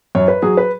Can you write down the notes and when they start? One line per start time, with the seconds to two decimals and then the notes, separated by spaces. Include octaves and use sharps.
0.15 F#2 C#5
0.28 B4
0.42 F#3 G#4
0.57 B4